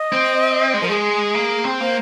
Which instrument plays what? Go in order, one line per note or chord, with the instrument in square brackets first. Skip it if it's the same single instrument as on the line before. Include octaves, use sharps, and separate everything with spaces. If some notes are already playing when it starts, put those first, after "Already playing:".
Already playing: [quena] D#5
[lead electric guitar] C4
G#3
[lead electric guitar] F3 [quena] A#4
[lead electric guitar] G#3 [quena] G#4
[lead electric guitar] A#3
C4
[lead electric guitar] A#3 [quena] C5